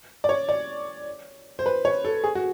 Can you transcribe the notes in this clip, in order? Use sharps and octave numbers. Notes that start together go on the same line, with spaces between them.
D5
C#5
D5
C5
B4
C#5
A4
G#4
F#4